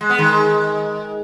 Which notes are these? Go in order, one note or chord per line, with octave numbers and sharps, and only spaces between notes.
G#3
B3
D#3 G#3